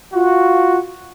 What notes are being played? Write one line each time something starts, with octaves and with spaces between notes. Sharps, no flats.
F4 F#4